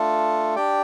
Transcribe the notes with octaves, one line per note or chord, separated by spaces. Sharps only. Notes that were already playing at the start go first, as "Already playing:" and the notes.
Already playing: A3 D4 F4 A4
D4 G4 D5 G5